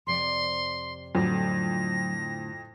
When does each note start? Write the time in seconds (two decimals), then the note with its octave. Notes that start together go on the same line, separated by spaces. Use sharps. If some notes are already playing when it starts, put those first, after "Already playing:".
0.07 F2 C3 D5 C6
1.15 F2 A2 D3 F#3 A#6